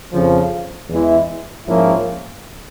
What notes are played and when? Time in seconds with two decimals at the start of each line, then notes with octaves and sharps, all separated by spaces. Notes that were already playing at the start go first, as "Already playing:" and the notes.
0.12 F2 C#3 F3
0.89 E2 E3 G#3 E4
1.67 G#2 F3 A#3 C#4 E4